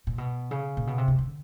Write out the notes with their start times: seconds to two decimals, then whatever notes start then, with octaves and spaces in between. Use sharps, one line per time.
0.07 A#2
0.18 B2
0.51 C#3
0.77 A#2
0.87 B2
0.98 C3
1.08 C#3
1.19 D3